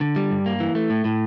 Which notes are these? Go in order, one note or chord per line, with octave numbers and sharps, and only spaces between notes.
D3
G3
G2
A#3
E3
A3
A2
A2